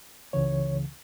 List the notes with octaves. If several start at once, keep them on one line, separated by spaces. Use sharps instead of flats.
C#2 C#3 E3 C#5